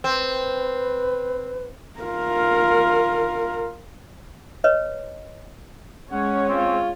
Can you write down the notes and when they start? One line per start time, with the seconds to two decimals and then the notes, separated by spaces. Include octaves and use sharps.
0.04 C4 B4
1.99 F4 A#4
4.64 B4 C#5 D#5
6.12 G#3 C#4 C#5 F#5
6.49 C4 F4